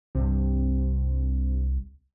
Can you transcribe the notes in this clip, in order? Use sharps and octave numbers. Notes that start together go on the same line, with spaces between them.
C2 G2 C3